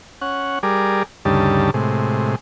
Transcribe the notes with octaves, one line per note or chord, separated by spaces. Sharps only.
C#4 F#5
G3 G#4 A#4 D5
D2 G2 C#3 G3 D#4 A5
A2 C3 G#3